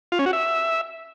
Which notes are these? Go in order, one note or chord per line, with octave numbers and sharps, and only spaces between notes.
F4
C#4
F#4
E5